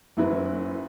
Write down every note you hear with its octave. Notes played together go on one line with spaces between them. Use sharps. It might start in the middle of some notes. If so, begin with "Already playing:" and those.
F#1 F#2 F#3 E4 B4